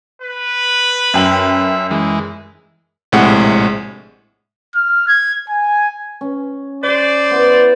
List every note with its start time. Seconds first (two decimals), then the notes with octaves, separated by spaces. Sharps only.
0.22 B4
1.14 F#2 E5 G5 F#7
1.91 E3 G#3
3.12 A#1 A2 C3 G#3 F#5
4.75 F6
5.08 G#6
5.49 G#5
6.21 C#4
6.83 G#4 C5 D5 C#6
7.31 B3 E4 C6